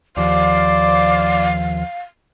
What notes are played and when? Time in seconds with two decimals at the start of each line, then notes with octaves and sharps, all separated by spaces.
0.17 D#2 F3 C5 D5 F5